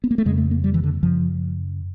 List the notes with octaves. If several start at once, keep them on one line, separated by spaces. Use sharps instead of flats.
B3
A#3
A3
F2 C#3 G#3
A3
A#3
G3
E3
D3
F#2 C#3 F3